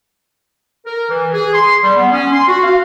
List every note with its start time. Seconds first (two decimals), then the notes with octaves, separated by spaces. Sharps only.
0.86 A#4
1.10 E3
1.33 G#4
1.53 C6
1.83 G3
1.97 B3
2.12 C#4
2.33 C6
2.48 F#4
2.64 F5